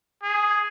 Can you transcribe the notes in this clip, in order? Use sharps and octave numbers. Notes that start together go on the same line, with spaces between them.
G#4